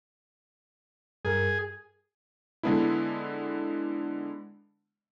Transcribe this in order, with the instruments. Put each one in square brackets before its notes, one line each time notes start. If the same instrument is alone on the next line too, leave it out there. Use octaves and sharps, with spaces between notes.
[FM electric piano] G2 A#4 [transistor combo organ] G#4
[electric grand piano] D3 G#3 B3 D4 E4